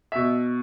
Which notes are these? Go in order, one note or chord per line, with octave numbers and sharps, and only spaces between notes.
B2 E5